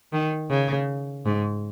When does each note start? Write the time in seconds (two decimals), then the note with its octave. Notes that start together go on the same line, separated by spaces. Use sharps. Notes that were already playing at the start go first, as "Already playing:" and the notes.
0.13 D#3
0.50 C#3
1.26 G#2